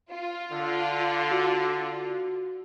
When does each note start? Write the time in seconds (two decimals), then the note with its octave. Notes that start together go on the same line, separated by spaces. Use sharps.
0.11 F4
0.52 D3
1.31 F#4